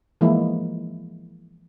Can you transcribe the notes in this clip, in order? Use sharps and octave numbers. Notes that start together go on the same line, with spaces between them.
E3 F3 G#3 A#3 E4